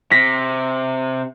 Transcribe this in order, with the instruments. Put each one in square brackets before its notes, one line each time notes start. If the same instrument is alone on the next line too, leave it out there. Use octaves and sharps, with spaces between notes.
[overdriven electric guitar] C3 [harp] A#6 B6